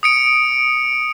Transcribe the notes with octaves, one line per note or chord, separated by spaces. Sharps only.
D#6 C#7 D7